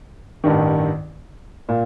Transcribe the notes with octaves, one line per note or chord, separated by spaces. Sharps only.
A1 G2 D#3
A#2